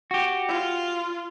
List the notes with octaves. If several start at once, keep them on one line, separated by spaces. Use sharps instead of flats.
F#4 G4
F4